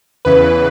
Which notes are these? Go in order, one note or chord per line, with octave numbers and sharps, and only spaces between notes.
E2 C#3 E3 B4